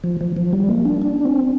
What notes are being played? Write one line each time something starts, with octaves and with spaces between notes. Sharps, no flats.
F3
F3
F3
G3
A#3
D4
D4
C4